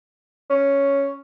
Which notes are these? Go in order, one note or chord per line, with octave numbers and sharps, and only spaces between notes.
C#4